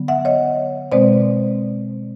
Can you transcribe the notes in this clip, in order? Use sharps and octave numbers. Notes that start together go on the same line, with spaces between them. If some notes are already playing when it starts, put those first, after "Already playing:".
Already playing: D3 F#3 B3
E5 F#5
C#5 D#5
B2 G#3 C4 C5 D5